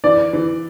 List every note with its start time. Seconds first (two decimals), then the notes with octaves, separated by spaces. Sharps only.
0.04 E3 D5
0.33 E3